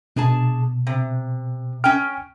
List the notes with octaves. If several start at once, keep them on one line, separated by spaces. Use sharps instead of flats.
B2 D4 G#4 A5
C3
C#4 G5 F6